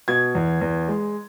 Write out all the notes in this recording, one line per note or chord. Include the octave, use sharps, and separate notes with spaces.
B2 G#6
E2
E2
G#3